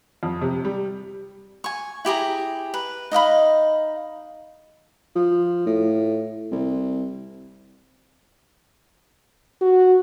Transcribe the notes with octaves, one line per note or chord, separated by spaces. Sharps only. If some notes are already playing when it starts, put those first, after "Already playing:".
F2
C3
G3
G#5 C#6
E4 G4 G#4 A#5
B4
D#4 D#5 F5 B5
F3
A2
C2
F#4